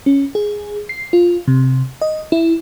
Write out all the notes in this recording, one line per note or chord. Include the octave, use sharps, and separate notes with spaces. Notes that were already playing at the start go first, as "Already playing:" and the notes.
C#4
G#4
C7
F4
C3
D#5
E4